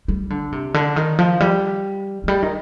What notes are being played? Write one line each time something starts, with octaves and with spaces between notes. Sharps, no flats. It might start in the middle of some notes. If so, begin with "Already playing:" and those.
G3
D3
C3
D3
D#3
F3
G3
F3
G3
D#3